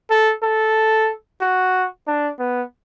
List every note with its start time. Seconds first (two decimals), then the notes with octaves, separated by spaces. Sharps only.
0.10 A4
0.42 A4
1.41 F#4
2.07 D4
2.39 B3